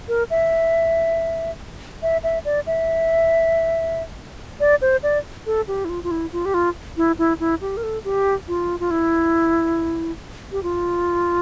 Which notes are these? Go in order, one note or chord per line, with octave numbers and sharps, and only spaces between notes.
A#4
E5
E5
E5
D5
E5
D5
C5
D5
A4
G4
E4
F4
F4
E4
F4
G4
F4
E4
E4
E4
G4
A#4
A4
G4
F4
F4
E4
G4
F4